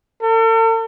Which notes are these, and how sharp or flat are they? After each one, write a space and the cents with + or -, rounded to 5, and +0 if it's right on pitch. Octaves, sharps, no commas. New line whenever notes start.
A4 +45